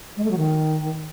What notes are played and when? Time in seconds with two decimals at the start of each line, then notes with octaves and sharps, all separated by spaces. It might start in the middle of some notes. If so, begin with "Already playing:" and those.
0.17 G#3
0.24 A3
0.31 F#3
0.38 D#3